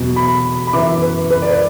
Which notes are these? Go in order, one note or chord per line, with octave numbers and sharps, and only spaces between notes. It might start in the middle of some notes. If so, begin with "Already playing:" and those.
Already playing: E2 B2 F#3
B5
B5
F#2 E3 B3 E4 D6
B4
B4
D5
B4